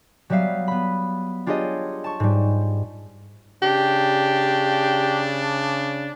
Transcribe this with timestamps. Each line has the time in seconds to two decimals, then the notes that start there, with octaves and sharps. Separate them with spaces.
0.30 F#3 G3 B3 E5 F5
0.68 B3 B5
1.46 D4 F4 G4 G#4 C#5 D#5
2.04 A5 C#6
2.20 G#2 G3
3.62 C#3 D4 G4